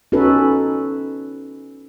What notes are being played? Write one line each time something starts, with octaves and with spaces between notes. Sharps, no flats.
C#4 D#4 F#4 A4 B4